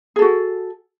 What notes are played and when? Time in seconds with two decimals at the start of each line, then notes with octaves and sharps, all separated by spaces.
0.16 G#4
0.19 A4
0.22 F#4